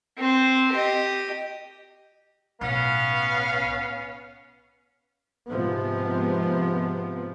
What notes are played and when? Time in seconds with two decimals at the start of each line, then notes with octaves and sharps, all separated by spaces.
0.17 C4 C5
0.71 G4 D#5
2.61 B1 A2 B3 C#4 F5
5.49 G#2 C3 F3 B3